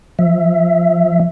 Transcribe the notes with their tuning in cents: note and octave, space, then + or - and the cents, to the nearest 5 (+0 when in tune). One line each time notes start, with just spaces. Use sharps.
F3 +0 E5 +0